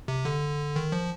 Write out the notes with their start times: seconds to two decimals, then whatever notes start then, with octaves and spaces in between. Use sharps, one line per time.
0.08 C3
0.25 D3
0.76 D#3
0.92 F3